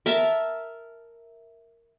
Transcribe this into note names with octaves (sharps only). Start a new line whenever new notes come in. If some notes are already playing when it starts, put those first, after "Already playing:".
A#4 E5 A5